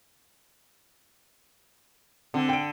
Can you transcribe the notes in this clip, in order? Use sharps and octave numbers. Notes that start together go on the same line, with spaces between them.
D3 C4
G5 D7